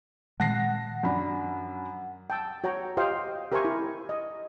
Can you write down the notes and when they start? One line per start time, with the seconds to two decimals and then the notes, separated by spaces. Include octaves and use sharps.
0.40 A#2 D#3 G#3 F#5 A5 A#6 C7
1.03 F#2 D4 B5
2.30 G5 A5 E6
2.64 F#4 C#5 G5 A#5
2.97 F4 G4 C5 D#5 F5 G5
3.52 G4 A#4 C5 E5 G#5 C#6
3.65 E4
4.09 D#5